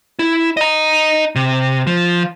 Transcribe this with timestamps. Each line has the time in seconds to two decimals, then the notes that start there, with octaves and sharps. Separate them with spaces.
0.19 E4
0.57 D#5 A#5
1.35 C3
1.87 F3